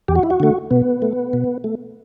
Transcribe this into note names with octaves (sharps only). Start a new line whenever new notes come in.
E2 G4
F#4
E4
F#4
D3 A3
B2 B3
A3
B2
A3